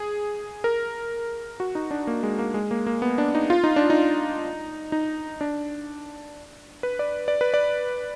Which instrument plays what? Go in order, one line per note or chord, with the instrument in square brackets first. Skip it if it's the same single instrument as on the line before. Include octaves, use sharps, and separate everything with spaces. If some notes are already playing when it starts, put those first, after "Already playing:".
Already playing: [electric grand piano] G#4
A#4
F#4
D#4
D4
A#3
G#3
A#3
G#3
A#3
A#3
B3
D4
D#4
F4
D#4
D4
D#4
D#4
D4
B4
D5
D5
B4
D5